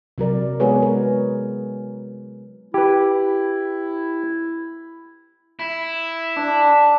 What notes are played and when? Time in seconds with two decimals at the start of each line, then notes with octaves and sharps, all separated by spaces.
0.18 C3 F#3 A#4 D5
0.60 G#3 B3 F#4 G#4 B4 C#5
0.82 A#4
2.74 E4 G4 B4
5.59 E4
6.36 D4